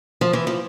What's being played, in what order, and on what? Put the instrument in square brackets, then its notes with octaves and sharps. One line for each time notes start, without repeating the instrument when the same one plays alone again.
[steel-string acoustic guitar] F3
E3
F3